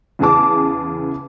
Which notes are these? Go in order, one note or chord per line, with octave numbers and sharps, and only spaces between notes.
E2 C#3 E3 G#4 A5 D6